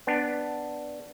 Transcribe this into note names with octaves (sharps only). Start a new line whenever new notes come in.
B3 D4